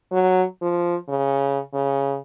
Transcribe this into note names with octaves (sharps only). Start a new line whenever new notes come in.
F#3
F3
C#3
C#3